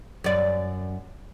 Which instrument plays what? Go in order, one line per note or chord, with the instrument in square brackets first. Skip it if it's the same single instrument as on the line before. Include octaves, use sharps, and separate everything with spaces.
[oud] F#2 D5